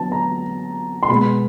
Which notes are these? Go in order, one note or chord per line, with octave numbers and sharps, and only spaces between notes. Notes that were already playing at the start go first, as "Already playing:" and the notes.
Already playing: D3 F#3 B3 A5
A#5
C6
B2 G#3 B3 B5